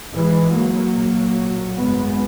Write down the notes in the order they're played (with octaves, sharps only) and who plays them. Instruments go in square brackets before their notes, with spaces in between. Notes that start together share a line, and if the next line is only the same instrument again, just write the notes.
[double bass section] G#1 G#2 E3 G#3
F#3 A#3
B1 A#2
G#1 F#2 C#3 G#3 B3